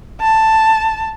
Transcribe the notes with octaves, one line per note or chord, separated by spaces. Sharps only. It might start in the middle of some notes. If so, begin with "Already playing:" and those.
A5